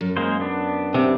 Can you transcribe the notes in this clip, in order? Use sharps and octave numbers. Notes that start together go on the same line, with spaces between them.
F#2
G#3 A#3 C5
B3 D4
C3